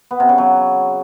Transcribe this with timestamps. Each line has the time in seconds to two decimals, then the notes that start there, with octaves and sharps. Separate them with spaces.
0.11 B3
0.20 C3
0.29 C#3
0.38 F#3